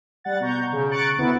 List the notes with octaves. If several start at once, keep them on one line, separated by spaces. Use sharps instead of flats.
G3 F#5 A6
B2 A#5 C#6 G6
C#3
A#5 C#6 F#6 A6 C#7 D7
D2 B3 E4 A6